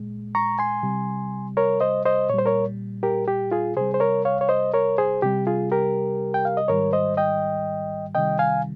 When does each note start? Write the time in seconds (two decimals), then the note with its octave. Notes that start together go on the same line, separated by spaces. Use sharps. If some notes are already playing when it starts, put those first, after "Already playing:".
Already playing: A#2 G#3
0.35 A#5 C#6
0.59 G#5 C6
0.83 C3 G3
1.57 A#4 C#5
1.81 C5 D#5
2.06 C5 D#5
2.29 A#2 C#5
2.34 G3 C5
2.46 A#4 C#5
3.03 G4 A#4
3.28 G4
3.51 F4 G#4
3.76 C3 G3 G#4 C5
3.94 C5
4.00 A#4 C#5
4.25 C#5 F5
4.41 C#5
4.49 C5 D#5
4.74 A#4 C#5
4.98 G#4 C5
5.22 C3 G3 G4
5.47 F4 G#4
5.72 G4 A#4
6.34 G5
6.45 F5
6.57 D#5
6.68 G#2 D#3 G3 A#4 C#5
6.93 C5 D#5
7.17 D#5 G5
8.15 C3 D#3 G3 D#5 G5
8.39 F5 G#5